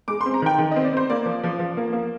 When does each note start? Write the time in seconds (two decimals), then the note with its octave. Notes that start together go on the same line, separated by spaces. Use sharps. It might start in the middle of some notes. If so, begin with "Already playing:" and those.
0.08 G#3 D6
0.21 C6
0.26 C4
0.34 A#5
0.42 D#3 G5
0.58 D#3
0.71 D#5
0.76 C4
0.84 D5
0.93 C4 C5
1.10 A#3 D5
1.25 F3
1.44 F3
1.59 F3
1.77 A#3
1.93 A#3